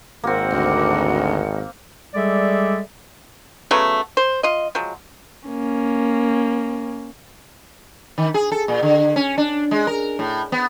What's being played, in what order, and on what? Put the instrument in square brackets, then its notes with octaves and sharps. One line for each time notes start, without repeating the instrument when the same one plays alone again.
[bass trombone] G#1 [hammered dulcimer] A#3 C4 [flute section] F#4 A#4 F#5
[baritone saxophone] D2
[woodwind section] G3 G#3 G#4 A4 D5 E5
[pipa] C#3 F#3 A3 B3
C5
F4 D#5
F3 F#3 G#3
[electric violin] A#3 C#4
[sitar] D#3
G#4
A4
A#2
D3
C#4
D4
G#3
A#4
A2
B3